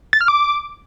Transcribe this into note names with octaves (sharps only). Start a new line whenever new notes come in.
A6
F6
D6